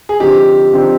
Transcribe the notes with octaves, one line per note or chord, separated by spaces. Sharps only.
G#4
D3 F3 C4 D#4 G4
D3 F3 C4 D#4